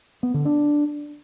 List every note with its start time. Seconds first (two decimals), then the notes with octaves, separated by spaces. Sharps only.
0.23 B3
0.34 D3
0.45 D4